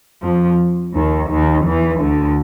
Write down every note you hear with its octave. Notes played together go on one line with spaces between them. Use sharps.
F2 F3
D#2 D#3
D#2 D#3
E2 E3
D2 D3